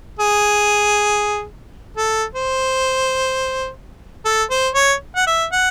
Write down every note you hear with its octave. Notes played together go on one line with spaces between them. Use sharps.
G#4
A4
C5
A4
C5
C#5
F#5
E5
F#5